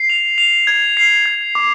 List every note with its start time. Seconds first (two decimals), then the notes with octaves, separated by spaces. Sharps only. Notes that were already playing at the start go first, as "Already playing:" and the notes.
Already playing: C7
0.10 F7
0.38 F7
0.67 G#6
0.97 C7
1.26 G#6
1.55 D6